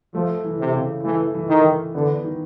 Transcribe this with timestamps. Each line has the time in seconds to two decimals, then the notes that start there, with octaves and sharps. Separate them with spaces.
0.14 F3 A3
0.44 E3
0.60 C3
0.75 C#3
1.04 E3 A3
1.34 E3
1.49 D#3
1.64 E3
1.94 D3 B3
2.24 D#3